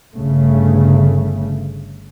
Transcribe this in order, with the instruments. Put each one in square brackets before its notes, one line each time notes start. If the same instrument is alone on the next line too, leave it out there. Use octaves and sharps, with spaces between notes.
[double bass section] G1 C#3 A3